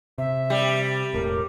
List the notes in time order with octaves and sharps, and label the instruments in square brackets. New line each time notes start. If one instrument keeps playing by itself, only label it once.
[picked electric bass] C3 [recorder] E5
[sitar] G3
[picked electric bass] E1 A2 [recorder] A#4